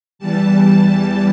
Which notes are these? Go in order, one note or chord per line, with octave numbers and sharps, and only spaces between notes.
E2 E3 G3 A5